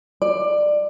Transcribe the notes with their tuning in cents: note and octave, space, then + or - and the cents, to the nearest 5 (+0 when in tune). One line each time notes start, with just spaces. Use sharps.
D5 +20